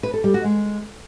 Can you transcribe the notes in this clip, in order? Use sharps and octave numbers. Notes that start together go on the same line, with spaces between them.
B4
A4
G3
F#4
G#3